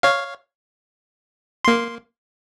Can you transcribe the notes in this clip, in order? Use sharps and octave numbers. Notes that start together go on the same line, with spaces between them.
C#5 F5
A#3 C6